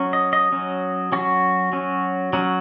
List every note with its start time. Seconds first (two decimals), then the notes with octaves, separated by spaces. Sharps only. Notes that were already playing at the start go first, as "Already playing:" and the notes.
Already playing: F#3 C#4
0.13 D#5
0.33 D#5
0.52 F#3 C#4
1.12 F#3 C#4 F#4
1.73 F#3 C#4
2.33 F#3 C#4